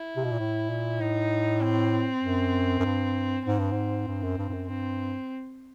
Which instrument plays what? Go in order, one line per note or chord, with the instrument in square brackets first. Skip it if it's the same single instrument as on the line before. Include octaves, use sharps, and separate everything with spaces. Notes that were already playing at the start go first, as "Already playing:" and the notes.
Already playing: [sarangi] E4
[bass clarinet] C3
B2
A#2
A2
A#2
[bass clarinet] A2 [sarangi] D#4
[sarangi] C4
[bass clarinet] F#2
F#2
G2
[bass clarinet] G#2 [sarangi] C4
[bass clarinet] G2
G#2
G2
F#2
G2
G2
F#2
[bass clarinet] G2 [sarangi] C4